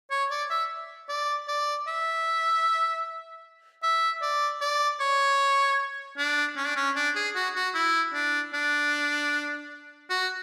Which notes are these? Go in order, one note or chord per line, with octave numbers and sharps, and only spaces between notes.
C#5
D5
E5
D5
D5
E5
E5
D5
D5
C#5
D4
C#4
D4
C#4
D4
G#4
F#4
F#4
E4
D4
D4
F#4